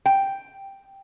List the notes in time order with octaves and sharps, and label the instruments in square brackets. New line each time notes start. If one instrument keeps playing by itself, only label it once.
[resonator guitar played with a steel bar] G5